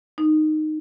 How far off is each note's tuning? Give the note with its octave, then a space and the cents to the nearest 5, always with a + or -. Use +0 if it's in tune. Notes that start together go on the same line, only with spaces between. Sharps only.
D#4 -10